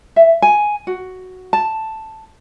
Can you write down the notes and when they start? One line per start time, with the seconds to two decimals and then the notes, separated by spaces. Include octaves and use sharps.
0.16 E5
0.42 G#5
0.87 F#4
1.53 A5